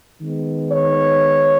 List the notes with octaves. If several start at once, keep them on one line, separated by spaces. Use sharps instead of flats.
D#3 G#3 B3
C#5